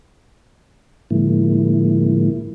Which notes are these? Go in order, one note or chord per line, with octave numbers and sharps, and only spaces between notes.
A2 D3 F3 G#3 A#3 E4